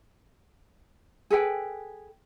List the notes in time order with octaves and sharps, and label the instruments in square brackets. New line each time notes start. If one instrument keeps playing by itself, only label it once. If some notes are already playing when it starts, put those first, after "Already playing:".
[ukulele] G#4 A4 B4 G5